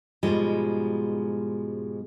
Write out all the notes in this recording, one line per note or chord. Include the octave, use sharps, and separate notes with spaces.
G#2 B2 F3 G3 G#3